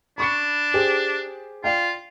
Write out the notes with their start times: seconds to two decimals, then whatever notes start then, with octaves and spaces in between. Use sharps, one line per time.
0.18 D4 B5 C#6 C#7
0.74 G4 G#4 C5
1.64 F4 D5 F5 G5